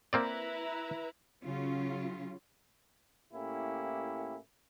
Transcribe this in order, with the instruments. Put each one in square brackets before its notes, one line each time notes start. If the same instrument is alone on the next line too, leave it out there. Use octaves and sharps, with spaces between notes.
[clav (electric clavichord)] A#3 C4 D5 [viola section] E4 B4 A#5
[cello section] C#3 F#3 C#4 F4
[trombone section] A2 A#3 C#4 E4 G4